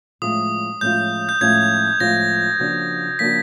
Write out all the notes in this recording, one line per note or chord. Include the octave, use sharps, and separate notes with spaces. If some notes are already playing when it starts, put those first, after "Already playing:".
A2 F3 G#3 C#4 F4 D#6
A2 F3 G#3 C#4 F4 G6
G6
A2 F3 G#3 C#4 F4 G#6
A2 F3 G#3 C#4 F4 A#6
C#3 F3 A#3 D4 F#4
C#3 F3 A#3 D4 F#4 B6